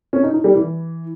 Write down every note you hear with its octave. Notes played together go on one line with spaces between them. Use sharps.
C#4
D#4
D#4
G3
E3